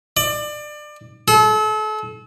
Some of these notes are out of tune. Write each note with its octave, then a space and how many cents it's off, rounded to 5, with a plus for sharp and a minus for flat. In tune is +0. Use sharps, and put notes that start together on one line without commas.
D5 +25
A4 -35